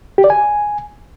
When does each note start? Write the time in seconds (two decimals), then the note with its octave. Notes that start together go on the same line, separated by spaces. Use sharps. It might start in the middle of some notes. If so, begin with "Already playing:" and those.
0.18 G4
0.24 D5
0.30 G#5